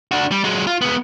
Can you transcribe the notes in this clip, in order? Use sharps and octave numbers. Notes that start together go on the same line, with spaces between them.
D4 F#4
G3
F#3 G#3
F4
G#3 B3